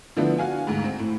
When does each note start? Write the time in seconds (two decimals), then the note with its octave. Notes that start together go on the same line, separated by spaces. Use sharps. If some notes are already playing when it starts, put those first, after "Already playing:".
0.16 D3 F3 B3 D4 E4
0.38 F#4 F5 G#5
0.67 D2 G#2
0.84 C4
0.99 A2